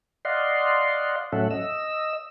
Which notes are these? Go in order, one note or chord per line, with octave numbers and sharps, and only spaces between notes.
D5 D#5 F5 F#5 C6
A2 F#3 C#4 A4 E5 F#5
D#5 E6